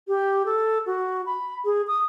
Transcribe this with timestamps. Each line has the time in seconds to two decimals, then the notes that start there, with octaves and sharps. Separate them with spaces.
0.08 G4
0.46 A4
0.86 F#4
1.26 B5
1.65 G#4
1.87 D#6